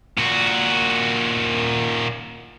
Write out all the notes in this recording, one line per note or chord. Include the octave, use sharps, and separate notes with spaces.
A#2 F#4